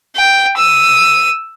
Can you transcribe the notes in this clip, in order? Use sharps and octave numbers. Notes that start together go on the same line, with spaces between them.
G5
E6 D#7